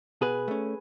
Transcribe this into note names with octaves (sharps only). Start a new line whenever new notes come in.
B2 G#4 B4
A3 C#4